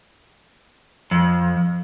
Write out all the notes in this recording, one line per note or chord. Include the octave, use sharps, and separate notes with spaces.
F2